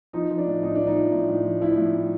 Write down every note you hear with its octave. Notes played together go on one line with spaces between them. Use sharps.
F3 D#4
F3
D4
A2
A2 D#4
F3 D4
D#4
F3
A2
A2
F3
F3 E4
A2
A2